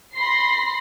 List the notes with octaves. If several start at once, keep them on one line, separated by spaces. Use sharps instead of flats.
B5 C6 A#6 C7